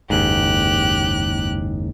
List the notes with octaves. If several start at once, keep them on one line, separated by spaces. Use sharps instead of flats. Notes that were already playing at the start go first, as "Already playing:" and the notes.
F#1 D#2 G#2 G4 F#6